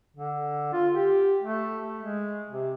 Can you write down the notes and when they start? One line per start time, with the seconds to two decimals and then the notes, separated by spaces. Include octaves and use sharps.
0.16 D3
0.73 F4
0.94 G4
1.42 A3
2.00 G#3
2.50 C3